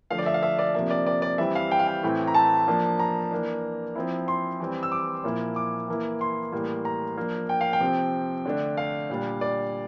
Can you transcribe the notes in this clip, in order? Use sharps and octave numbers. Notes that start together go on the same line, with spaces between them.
D3 F3 A3 F5
D5
E5
F5
E5
D5
C3 F3 A#3 D4 E5
D5
D5
D5
E3 G3 C4 E4 E5
F5
G5
F5
G5
A2 E3 A3 C4 E4
A#5
A5
F3 A#3 D4
A#5
E3 A#3 D4
F3 C4 E4
C6
E3 G3 C4
E6
D6
A#2 F3 A#3 E4
D6
E3 A#3 E4
C6
A2 E3 G3 A#3
A#5
F3 A#3 D4
G5
F5
G5
C3 F3 C4
D3 A3 D4
F5
A#2 G3 D4
D5